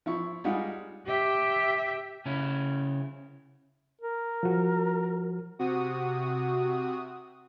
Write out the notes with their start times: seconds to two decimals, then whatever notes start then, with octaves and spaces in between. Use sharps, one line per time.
0.06 F3 E4 C#6
0.44 G3 G#3 D#4 F4 F#5
1.07 G4 E5
2.26 C#3 C#4 E4
4.01 A#4
4.43 F3 F#4
5.59 C3 F#4 D#6